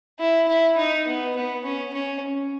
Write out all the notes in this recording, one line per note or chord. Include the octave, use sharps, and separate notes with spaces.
E4
E4
D#4
B3
B3
C#4
C#4